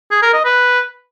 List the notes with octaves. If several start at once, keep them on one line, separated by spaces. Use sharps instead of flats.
G#4
A#4
D#5
B4